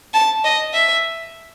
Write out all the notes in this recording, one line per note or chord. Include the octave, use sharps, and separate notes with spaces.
A5
D#5
E5